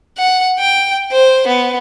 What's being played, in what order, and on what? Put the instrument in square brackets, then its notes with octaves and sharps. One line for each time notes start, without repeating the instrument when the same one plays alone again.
[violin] F#5
G5
C5
B3